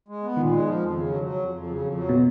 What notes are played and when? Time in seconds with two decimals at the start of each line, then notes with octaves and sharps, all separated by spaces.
0.08 G#3
0.23 B3
0.36 A#2 D#3
0.51 G#3
0.66 F3
0.80 F2
0.94 C#3
1.08 F#3
1.23 F#3
1.38 F2
1.52 F2
1.67 C#3
1.81 F2
1.95 F#3
2.09 B2